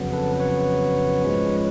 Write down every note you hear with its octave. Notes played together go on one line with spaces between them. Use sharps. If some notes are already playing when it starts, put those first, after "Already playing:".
Already playing: F2 C#3 F#3 B3
A4 B4
B4 C#5
G#2 F3 G#3 C#4